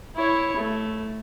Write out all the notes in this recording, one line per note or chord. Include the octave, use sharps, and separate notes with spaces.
E4 C#5
A3